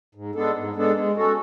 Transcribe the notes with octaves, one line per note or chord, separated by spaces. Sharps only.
G#2
G#3 B3 D4 A4
G#2
G#3 B3 D4 A4
G#3
C#4 F#4 A4